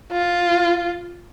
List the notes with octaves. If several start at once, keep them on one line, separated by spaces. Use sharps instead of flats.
F4